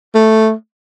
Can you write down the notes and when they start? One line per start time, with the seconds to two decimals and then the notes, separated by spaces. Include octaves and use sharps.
0.15 A3